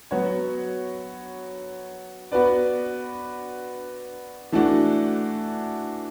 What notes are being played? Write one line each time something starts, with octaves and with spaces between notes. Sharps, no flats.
F#3 B3 F#4 C#5
B3 F#4 B4 D5
E3 A3 D4 F#4